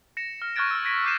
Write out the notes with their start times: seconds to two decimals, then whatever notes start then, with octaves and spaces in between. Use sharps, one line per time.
0.17 A#6 C#7 E7
0.42 F6
0.56 C#6 F6 F#6 G#6 A6 D7
0.71 E6 F6
0.85 G#6 A#6 B6 D7
1.04 D6 E6 G6 C7 D#7 E7